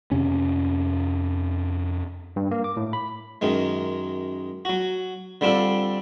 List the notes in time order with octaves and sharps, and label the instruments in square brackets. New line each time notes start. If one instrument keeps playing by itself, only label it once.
[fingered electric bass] F2 C3 C#4
[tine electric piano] G2
A#3
D6
A2
B5
[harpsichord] F#2 D#3 G#3
F#3 F#4
D3 G3 C4 D4 F4 A4